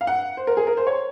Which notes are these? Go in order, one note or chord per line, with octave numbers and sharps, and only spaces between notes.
F5
F#5
C5
A#4
G#4
A#4
C5
C#5